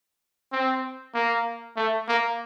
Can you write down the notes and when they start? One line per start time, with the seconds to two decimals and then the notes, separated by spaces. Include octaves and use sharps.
0.52 C4
1.14 A#3
1.76 A3
2.08 A#3